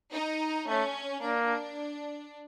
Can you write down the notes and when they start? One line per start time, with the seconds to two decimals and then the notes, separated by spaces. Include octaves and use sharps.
0.12 D#4
0.67 A3 C#4
1.21 A#3 D4